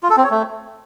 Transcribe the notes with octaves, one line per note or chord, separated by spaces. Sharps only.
F4
A4
C4
C#5
A3